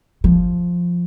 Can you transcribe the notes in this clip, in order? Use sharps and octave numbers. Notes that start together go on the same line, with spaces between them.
F3